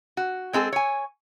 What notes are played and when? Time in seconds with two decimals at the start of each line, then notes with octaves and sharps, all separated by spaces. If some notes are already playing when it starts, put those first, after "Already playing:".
0.17 F#4
0.53 G#3 C4 G#4 A4
0.73 C#5 G#5